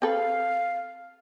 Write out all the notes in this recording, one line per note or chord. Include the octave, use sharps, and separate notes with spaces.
C4 A4 B4 F5